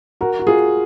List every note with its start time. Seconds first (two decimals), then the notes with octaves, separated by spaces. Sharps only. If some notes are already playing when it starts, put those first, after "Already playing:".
0.21 F#4 A#4
0.39 F#4
0.47 F4 G#4